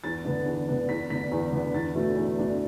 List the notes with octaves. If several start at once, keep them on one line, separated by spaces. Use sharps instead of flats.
E2 A6
D3 B3 D4
E2
D3 B3 D4
E2 B6
D3 B3 D4 B6
E2
D3 B3 D4
E2 A6
B2 A3 D4
E2
B2 A3 D4